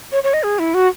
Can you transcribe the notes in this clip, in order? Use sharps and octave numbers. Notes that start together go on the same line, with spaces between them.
C#5
C#5
D#5
G#4
E4
F#4